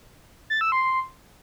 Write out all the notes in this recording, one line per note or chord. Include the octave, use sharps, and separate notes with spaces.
A6
E6
C6